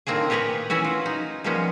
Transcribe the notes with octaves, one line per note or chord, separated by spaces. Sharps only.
A2 D#3 A#3 C4 D4 G#4
G4 G#4 A#4 B4 C#5
E3 C#4 E4 F#4
F4
D#4
F3 G3 G#3 A#3 B3 C#4